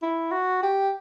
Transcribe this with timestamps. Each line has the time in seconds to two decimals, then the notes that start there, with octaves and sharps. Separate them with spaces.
0.02 E4
0.32 F#4
0.63 G4